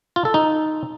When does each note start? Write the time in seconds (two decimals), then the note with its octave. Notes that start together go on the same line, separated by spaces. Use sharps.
0.16 F4
0.25 A4
0.34 D#4